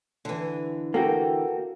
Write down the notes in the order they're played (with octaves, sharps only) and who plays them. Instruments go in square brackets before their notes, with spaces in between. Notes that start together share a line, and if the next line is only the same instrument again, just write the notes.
[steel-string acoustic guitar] D3 E3
[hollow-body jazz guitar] A#3 F#4 G4 [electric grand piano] A4